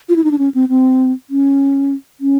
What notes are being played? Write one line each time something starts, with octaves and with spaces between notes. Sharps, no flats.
F4
E4
D#4
D4
C#4
C4
C4
C#4
C#4